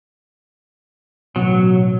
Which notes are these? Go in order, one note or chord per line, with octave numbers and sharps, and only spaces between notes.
A1 B2 F#3